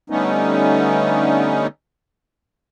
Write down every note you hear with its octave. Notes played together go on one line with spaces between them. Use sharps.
D3 G3 A3 B3 C#4 D#4